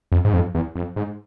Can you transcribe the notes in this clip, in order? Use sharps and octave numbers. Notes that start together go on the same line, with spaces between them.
F2
G#2
F2
E2
F2
G#2